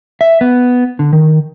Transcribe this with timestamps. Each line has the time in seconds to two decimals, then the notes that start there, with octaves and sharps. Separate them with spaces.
0.21 E5
0.41 B3
0.99 D3
1.13 D#3